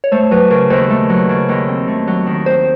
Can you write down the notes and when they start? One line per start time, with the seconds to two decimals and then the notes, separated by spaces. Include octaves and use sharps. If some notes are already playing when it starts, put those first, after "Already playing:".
0.04 C#5
0.12 A3 C5
0.31 F#3 B4
0.50 C#3 A#4
0.70 D#2 C5
0.90 A3
1.09 F#3
1.29 C#3
1.49 D#2
1.68 C4
1.88 A3
2.07 F#3
2.26 D#3
2.46 C4 C5